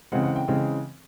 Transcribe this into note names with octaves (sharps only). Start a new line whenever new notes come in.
C#3 E3 G#3 C4 F#5
F#5
G5
C#3 E3 G#3 C4